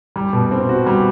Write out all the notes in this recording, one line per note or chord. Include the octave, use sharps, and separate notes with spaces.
G3
B2
C4
F#4
G3